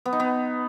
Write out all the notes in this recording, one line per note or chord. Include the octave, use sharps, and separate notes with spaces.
B3
D#4
B3